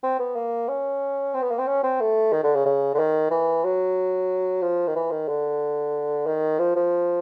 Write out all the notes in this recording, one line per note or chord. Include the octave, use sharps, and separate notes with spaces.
C4
B3
A#3
C#4
C4
B3
A#3
C4
C#4
C4
A3
D#3
D3
C#3
C#3
D3
D#3
E3
F#3
F3
D#3
E3
D#3
D3
D#3
F3
F3